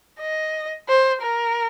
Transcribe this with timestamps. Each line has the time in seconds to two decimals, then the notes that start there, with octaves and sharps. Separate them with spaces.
0.20 D#5
0.88 C5
1.22 A#4